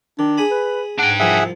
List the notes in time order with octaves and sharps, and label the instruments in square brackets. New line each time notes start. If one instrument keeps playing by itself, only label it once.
[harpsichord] D#3 [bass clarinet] D4
[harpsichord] G#4 G#5 B5
[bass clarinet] B4
[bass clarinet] G#2 [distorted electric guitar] D4 G5 [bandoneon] F#5
[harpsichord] C2 F3 [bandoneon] G#4 E5 F#5